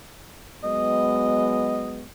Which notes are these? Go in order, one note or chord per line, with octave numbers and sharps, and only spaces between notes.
F#3 G#3 B3 D#5